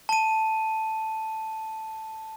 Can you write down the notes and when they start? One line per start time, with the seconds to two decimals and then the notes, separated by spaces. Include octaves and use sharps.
0.09 A5 D#7